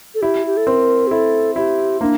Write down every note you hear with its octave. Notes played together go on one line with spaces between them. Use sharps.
A4
E4 G4
G4
A4
C4 A#4
G4
E4 A4
E4 G4
A#3 D4